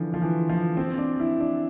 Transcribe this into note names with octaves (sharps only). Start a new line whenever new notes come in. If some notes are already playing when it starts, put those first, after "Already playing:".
Already playing: D3 E3 F3
F3
E3
F3
C4
D4
E4
D4